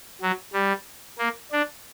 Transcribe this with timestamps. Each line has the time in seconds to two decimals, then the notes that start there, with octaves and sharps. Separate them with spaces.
0.21 F#3
0.53 G3
1.19 A#3
1.52 D4